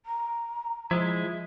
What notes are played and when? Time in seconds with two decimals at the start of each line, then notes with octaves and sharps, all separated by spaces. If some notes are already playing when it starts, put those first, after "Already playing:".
0.06 A#5
0.91 F3 G#3 E4